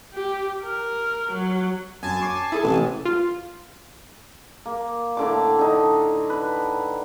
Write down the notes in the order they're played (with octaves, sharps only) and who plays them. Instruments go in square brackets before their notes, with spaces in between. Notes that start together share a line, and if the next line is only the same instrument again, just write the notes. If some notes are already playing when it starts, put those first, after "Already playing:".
[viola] G4
A#4
F#3
[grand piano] F#2 [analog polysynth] G#5 A5
[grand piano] C#6 D6 C7
[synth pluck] E4 G#4 A4
[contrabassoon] A1 [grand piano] C3
[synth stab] F4
[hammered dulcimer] A#3
A2 D3 D6
D3 D#4
B4